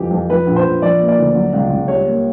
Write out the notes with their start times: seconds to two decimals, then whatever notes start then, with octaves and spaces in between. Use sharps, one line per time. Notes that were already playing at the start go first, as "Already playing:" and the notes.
Already playing: F2 E3 G4
0.11 F2
0.30 F3 B4
0.46 A#1
0.56 C5
0.65 A#1
0.82 F3 D5
1.00 A#3
1.08 D5
1.18 D2
1.35 F#3
1.53 C#2
1.70 C#2
1.88 G3 C#5
2.06 A#3